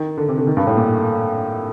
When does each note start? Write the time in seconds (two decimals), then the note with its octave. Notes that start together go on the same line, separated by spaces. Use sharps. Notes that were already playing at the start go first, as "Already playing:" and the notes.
Already playing: D#3
0.17 D3
0.28 C3
0.38 D3
0.47 D#3
0.57 G2
0.67 A2
0.77 A#2